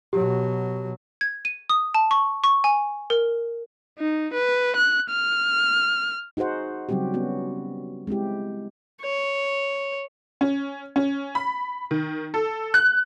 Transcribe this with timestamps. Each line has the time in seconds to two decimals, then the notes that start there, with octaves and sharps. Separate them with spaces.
0.13 B2 F#3 G4
1.21 G#6
1.45 D#7
1.69 D#6
1.94 A5
2.11 C#6
2.44 C#6
2.64 G#5
3.10 A#4
3.99 D#4
4.33 B4
4.76 F#6
5.11 F6
6.37 D#4 F#4 G#4 C5 F#5
6.89 C#3 F#3 G3 C4 F#4 G4
7.14 B3 C#4 F#4
8.07 G#3 C4 E4 G4
9.01 C#5
10.41 C#4
10.96 C#4
11.35 B5
11.91 D#3
12.34 A4
12.74 F#6